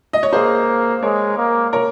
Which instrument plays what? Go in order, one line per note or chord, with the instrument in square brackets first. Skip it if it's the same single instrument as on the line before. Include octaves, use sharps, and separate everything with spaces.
[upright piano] D#5
C#5
[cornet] A#3 [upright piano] G#4 C5
[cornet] G#3 [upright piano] A#4 C#5
[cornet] A#3
[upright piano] A#4 C#5